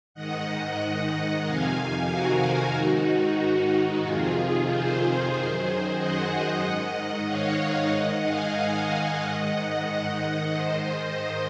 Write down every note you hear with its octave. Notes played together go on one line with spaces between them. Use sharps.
G#2 D#3 D#5 F#5
F2 C3 D#3 F5 G#5
F#4 A#4
G#2 D#3 D#4 F#4
F2 C3 D#3 F4 G#4
G#4 C5
F#2 D#3
D#5 F#5
G#2 D#3
C#5 F5
G#2 D#3 D#5 F#5
F5 G#5
D#5 F#5
G#2 D#3
G#2 D#3 C5 D#5
C5 D#5